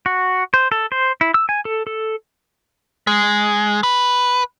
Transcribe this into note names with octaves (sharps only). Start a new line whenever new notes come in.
F#4
C5
A4
C5
E4
E6
G#5
A4
A4
G#3
B4